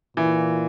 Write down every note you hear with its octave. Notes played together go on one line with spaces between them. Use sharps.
A#2 E3